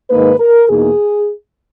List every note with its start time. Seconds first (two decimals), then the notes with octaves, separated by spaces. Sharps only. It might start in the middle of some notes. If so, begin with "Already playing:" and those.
0.10 G#2 D#3 A#3 D#4 B4
0.40 A#4
0.69 E2 B2 A#3 D#4 G#4